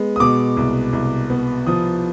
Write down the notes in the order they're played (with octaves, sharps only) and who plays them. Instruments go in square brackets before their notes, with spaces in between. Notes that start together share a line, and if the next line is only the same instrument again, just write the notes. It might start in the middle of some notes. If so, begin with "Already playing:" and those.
Already playing: [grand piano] G#3 B3
D#6
B2 D6
C2
C2
B3
F3 D#6